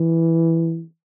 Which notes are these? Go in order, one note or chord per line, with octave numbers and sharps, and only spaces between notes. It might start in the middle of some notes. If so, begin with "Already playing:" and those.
Already playing: E3